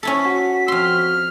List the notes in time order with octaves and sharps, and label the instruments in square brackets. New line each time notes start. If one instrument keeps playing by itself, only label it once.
[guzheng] C#4 E4 A4 [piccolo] B6
[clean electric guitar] F#4
[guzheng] F2 C6 [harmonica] F6